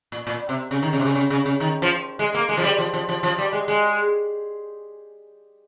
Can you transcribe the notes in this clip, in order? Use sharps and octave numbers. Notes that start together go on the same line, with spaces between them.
A#2
A#2
C3
C#3
D#3
C#3
C3
C#3
C#3
C#3
C#3
D#3
F3
G#3
A#3
G#3
F3
G3
F3
F3
F3
F3
G3
G#3
G#3